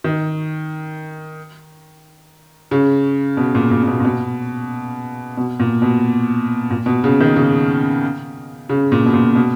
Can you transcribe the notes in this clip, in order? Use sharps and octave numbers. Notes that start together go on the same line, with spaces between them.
D#3
C#3
B2
A#2
A#2
A#2
B2
A#2
B2
B2
A#2
B2
A#2
B2
C#3
D#3
C#3
C#3
A#2
B2
A#2
B2